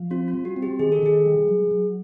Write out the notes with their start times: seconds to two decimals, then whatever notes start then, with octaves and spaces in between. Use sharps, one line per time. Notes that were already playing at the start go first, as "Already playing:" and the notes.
Already playing: F3
0.10 C4 F4
0.28 F4
0.33 G3
0.45 F#4
0.56 C4
0.62 G4
0.79 D#3 G#4
0.92 A4
1.03 D#3 G#4
1.26 G3
1.48 F#3
1.71 F#3